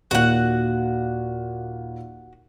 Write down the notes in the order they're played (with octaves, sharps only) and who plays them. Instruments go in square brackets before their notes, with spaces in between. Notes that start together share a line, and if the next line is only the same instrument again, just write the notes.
[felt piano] D#2 A#2 [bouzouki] F#4 F#5